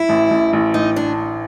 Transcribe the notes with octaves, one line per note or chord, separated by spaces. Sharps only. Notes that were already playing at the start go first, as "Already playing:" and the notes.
Already playing: E4
A1
A1
A1
A1 D#4
D4